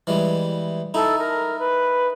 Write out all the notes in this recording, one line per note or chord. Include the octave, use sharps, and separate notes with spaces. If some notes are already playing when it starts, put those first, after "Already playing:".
E3 G3 G#3
D#4 E4 A4
A#4
B4